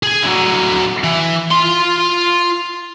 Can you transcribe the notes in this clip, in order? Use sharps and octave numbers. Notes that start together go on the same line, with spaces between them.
G#4 G#5
D3 F#3
E3
F4 C6